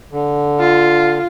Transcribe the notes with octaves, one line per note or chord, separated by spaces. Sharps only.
D3
F4